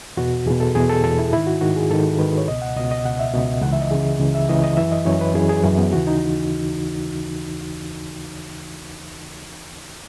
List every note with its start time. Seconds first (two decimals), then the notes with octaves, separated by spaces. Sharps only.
0.17 E2 B2 F#4
0.46 E2 B2 G#4
0.60 A4
0.75 E2 B2 G#4
0.90 A4
1.04 E2 B2 A4
1.19 E4
1.32 G#2 D#3 E4
1.47 F#4
1.61 G#2 D#3 F#4
1.76 G#4
1.90 G#2 D#3 A4
2.19 G#2 D#3 B4
2.38 C#5
2.47 C#2 B2 D#5
2.62 F#5
2.76 C#2 B2 D#5
2.91 D#5
3.06 C#2 B2 F#5
3.19 E5
3.34 C#2 B2 D#5
3.62 C#2 C#3 E3 F#5
3.73 E5
3.82 D#5
3.91 C#2 C#3 E3 G#4
4.20 C#2 C#3 E3
4.35 E5
4.49 C#2 C#3 E3 D#5
4.64 D#5
4.77 F#2 E3 E5
4.92 D#5
5.06 F#2 E3 C#5
5.21 B4
5.34 F#2 E3 G#4
5.49 G#4
5.64 F#2 E3 C#4
5.78 B3
5.92 D#2 C#3 E3 F#4
6.07 D#4